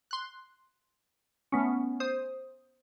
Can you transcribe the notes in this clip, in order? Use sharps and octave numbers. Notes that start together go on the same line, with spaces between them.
C6 F#6
A3 B3 C#4
C5 D#6